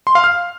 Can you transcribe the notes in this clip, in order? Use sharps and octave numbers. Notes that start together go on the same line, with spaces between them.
C6
F5
F6